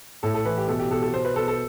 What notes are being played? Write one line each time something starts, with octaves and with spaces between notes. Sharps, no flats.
A2 A4
A4
E3 B4
G4
B2 A4
G4
B2 A4
A4
B2 C5
B4
B2 A4
A4